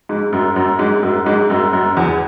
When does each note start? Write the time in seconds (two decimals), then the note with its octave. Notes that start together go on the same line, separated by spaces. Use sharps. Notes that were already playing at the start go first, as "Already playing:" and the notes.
0.09 G#2
0.33 F#2
0.56 F#2
0.79 G#2
1.03 F#2
1.26 G#2
1.50 F#2
1.73 F#2
1.97 E2